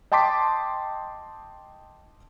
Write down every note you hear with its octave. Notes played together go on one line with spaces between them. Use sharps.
D#5 G5 A5 C6 D6 B6